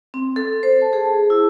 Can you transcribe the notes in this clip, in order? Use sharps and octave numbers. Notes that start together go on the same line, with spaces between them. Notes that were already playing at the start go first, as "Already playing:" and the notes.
C4
A4
C5
A5
G#4
E4